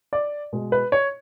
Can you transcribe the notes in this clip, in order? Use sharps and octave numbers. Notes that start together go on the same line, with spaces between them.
D5
B2 G#3
B4
C#5